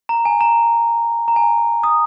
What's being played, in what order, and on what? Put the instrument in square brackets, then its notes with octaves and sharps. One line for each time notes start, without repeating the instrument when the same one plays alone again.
[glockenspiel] A#5
G#5
A#5
A#5
G#5
D#6